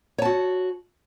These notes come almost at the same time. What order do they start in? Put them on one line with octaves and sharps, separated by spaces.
C#5 A5 F#4